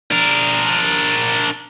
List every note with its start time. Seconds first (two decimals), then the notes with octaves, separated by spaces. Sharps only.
0.11 D4 A#4